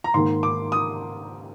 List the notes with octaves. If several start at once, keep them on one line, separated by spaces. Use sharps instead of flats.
A#5
G#2 D#3 A#3 C6
D6
D#6